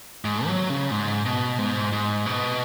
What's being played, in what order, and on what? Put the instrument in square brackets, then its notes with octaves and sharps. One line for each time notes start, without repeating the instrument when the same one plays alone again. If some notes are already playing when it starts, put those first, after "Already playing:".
[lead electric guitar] G#2
F#3
C#3
G#2
B2
G#2
G#2
B2